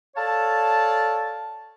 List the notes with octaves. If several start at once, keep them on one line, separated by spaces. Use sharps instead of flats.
A4 C#5 D5 F5 A5